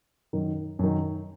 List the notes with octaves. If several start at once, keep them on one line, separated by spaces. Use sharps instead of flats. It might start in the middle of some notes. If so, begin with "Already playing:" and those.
F#2 D#3
F#2 D#3